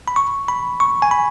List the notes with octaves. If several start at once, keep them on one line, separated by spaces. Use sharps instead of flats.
B5
C#6
B5
C#6
G#5
B5